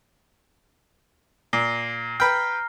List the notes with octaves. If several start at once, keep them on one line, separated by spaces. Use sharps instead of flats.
A#2 A#6 C7 G7
B4 G5 A#5 F6